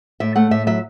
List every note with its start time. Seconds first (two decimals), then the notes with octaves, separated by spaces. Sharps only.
0.20 A2 E5
0.36 A3 F#5
0.51 A2 E5
0.67 F#3 E5